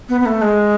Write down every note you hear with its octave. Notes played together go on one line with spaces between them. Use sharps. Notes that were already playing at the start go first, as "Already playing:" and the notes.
B3
B3
A3
G#3